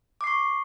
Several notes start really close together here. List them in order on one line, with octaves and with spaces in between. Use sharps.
D6 C7 C#6